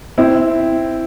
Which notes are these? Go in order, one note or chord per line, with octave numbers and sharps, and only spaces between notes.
C4 E4